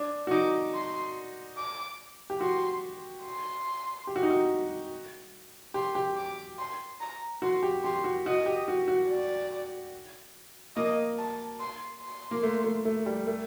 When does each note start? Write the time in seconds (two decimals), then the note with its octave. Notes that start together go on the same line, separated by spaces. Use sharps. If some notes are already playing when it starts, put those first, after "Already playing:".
Already playing: D4
0.27 F#4
0.31 D#4 D6
0.74 C6
1.58 D6
2.30 G4
2.40 F#4 C6
3.24 C6
4.07 G4
4.16 F#4
4.23 D#4
4.31 F#4
5.74 G4 C6
5.95 G4
6.17 D6
6.58 C6
7.00 A#5
7.42 F#4 C6
7.63 G4
7.84 G4 C6
8.04 F#4
8.26 F#4 D#5
8.46 G4
8.68 F#4
8.88 F#4
9.09 D5
10.76 A#3 D#5
11.18 A5
11.60 C6
12.01 C6
12.31 A#3
12.43 A3
12.64 A3
12.85 A3
13.06 G3
13.27 A3